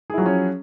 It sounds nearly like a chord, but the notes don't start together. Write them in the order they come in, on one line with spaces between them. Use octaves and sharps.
G#4 E4 F#3 F3 C#4